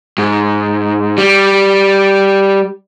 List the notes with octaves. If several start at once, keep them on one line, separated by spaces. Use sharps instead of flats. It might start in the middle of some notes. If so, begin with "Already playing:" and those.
G#2
G3